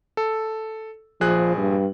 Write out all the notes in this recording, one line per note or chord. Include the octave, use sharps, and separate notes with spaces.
A4
A#1 F3 G#4 F#6
G2